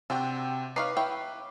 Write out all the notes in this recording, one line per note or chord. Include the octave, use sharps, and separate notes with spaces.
C3 C4 D4 F#4 G5
D#4 B4 C#5 F5 D6 C7
E4 C#5 G5